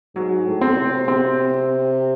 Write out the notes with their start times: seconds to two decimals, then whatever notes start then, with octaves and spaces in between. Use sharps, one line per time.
0.15 G#2 F#3
0.46 A2
0.61 C4
0.77 C3
1.08 C4